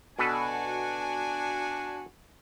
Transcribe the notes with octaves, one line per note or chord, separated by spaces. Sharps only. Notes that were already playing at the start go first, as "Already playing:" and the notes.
B2 D4 F#4 A4 B4 G#5